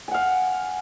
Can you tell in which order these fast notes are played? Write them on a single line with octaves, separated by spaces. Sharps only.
G#5 F#5 F5